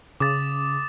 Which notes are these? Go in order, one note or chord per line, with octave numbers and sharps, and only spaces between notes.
C#3 D6 D#6 A6